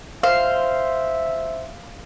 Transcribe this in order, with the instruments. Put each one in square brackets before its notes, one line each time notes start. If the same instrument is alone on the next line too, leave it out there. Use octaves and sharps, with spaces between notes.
[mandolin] C5 [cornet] E5 [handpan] F5